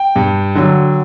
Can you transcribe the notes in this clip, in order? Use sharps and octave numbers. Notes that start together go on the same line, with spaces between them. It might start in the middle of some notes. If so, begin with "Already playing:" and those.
Already playing: G5
G2
D3 F#3